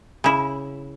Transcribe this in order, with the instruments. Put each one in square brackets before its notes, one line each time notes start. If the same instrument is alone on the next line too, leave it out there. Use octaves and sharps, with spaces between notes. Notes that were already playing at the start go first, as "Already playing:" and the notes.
[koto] C#3 E4